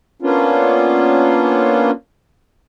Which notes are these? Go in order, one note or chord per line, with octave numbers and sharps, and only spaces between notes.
A#3 B3 C#4 D4 F4